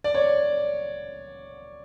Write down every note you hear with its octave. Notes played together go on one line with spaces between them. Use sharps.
D5
C#5